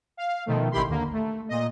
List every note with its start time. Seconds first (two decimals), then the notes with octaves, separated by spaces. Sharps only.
0.17 F5
0.46 B2 D#3 F3 A3
0.71 A1 D#3 E4 G4 B5 C6
0.88 D#2 D3 A#3
1.13 A3
1.49 A#2 D#5